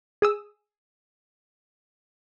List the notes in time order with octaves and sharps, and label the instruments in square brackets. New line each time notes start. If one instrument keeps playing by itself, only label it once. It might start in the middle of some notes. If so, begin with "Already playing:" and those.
[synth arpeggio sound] G#4 D#6 E6